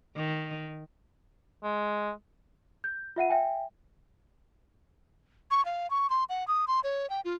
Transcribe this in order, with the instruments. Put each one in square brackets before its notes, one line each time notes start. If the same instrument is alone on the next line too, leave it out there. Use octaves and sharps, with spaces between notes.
[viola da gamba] D#3
[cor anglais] G#3
[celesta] G6
F4 E5 F#5 D#7
E5 G5 G#5
[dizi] C#6
F5
C#6
C6
F#5
D#6
C6
C#5
G5
F4